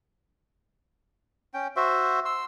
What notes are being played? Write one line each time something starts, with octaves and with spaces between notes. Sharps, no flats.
C#4 G5
F#4 C5 E5
C6 E6